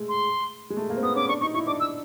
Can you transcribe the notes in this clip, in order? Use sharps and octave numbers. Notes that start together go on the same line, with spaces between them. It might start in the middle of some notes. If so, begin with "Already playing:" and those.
Already playing: G#3 A3
C6
G#3
A3
A#3
C4
B3 D#6
C#4 D6
D4 C#6
D#4 C#6
E4 C#6
D4 D6
E6